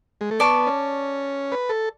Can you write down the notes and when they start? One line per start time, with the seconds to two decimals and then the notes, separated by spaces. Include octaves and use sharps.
0.21 G#3
0.31 A3
0.40 B3 D5 A5 C#6
0.67 C#4
1.52 B4
1.69 A4